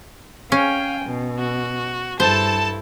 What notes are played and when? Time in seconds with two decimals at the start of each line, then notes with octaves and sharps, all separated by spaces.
0.52 C#4 F5 G5 G#5
1.05 B2
1.39 F#4
2.20 G2 E4 A4 C5 A5